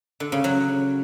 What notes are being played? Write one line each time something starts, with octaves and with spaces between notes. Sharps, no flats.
D3
C#3
F#3